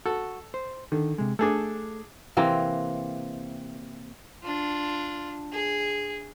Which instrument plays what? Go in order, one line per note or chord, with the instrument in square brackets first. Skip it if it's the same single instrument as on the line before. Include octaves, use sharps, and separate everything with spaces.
[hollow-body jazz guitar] F#4 [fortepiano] A4
[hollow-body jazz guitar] C5
[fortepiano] D3 [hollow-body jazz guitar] D#3
[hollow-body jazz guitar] C3 G#3
[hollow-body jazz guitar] A3 [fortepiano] D4 G#4 A4
[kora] C3 E3 A#3 C4
[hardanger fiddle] D4 F4
G#4